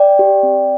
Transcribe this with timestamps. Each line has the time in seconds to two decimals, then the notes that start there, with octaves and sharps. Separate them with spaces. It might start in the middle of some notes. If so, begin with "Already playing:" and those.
Already playing: D5 G5
0.19 G4
0.43 C4